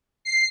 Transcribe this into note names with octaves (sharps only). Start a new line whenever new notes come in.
C7